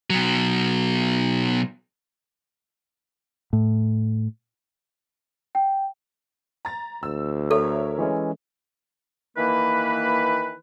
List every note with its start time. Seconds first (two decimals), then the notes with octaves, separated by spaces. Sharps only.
0.10 B2 F#3
3.53 A2
5.55 G5
6.65 A#5 A6
7.03 D2 E6
7.51 A4 A#4 C#5 E5
7.98 E3 G#3 C#4
9.37 D#3 E3 A#3 B4